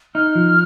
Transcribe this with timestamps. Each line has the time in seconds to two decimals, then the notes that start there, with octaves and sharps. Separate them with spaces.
0.15 D#4 F6
0.35 F3